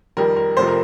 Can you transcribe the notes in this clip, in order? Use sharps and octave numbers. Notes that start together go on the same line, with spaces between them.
F2 D#3 G3 A#4
A#4
F1 F2 C3 F3 C5
A#4